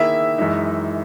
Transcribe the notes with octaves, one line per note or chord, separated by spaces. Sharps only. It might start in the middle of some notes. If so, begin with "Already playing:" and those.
Already playing: D#3 A#3 E4 G#4 E5
F#2 E3 G#3 D#4